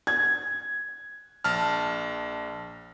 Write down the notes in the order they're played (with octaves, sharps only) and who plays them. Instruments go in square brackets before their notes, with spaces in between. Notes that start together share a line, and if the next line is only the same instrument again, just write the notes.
[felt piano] G#6
[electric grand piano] A#1 A5 F6